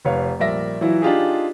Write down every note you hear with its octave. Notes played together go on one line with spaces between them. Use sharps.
F1 B4 C#5 F5
A#1 G3 A#4 D5 E5 A#6
E3 F#3 E4 F4
D4 D#4 F4 G4 G#4